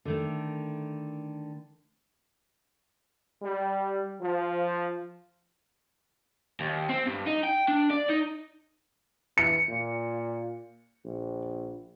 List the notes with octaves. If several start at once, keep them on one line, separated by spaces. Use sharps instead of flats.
D3 D#3 A3
G3
F3
D#2
C4
G2
D#4
G5
D4
D5
D#4
E3 C#7
A#2
A#1